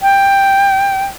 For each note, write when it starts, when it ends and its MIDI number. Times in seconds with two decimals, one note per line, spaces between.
0.01 1.05 79